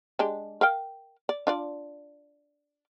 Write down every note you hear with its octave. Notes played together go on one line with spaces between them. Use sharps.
G#3 D4 G4
A#4 F5 G5
D5
D4 F4 D5